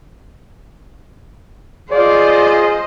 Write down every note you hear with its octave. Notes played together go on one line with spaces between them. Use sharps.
F4 G#4 C5 D5 D#5